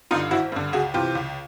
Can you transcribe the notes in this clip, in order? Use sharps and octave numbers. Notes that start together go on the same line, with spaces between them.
G2 D3 D#4 F4
G#1 E4 F#4
G2 D3
C#2 F#4 G#4
C3 E3 F4 G4
C#2